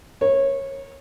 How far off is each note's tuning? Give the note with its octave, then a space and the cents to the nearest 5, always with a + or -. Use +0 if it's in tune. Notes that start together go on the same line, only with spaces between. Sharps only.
A#4 +35 C#5 -20